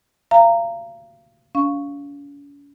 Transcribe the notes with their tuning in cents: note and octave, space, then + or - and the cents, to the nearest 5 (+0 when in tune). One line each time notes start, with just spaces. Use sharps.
F5 -35 A#5 -15
C#4 +45 F5 +0 C#6 +0